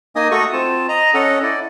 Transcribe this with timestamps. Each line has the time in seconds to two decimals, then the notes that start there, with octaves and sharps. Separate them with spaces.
0.16 A#3 D#4 D#5 G#5 D#6
0.31 A3 F#4 A4 C#6 D#6
0.53 C4 F4 A5
0.89 D#5 A#5
1.14 C#4 A4 D#5 F#5
1.43 E4 D5